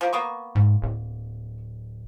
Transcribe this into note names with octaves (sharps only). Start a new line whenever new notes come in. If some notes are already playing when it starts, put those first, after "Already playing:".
F3 A#3
A#3 B3 C#6
G#2
D1